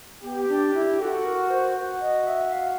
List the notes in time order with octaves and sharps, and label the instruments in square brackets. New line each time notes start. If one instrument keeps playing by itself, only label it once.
[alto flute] B3 [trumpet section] G4
[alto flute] D4
E4
[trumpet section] F#4 [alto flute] A4
[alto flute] A#4
C5
[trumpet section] F#4
[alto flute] D#5
E5
F5